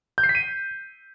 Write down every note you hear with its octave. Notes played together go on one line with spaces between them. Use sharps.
G6
C7
B6
D#7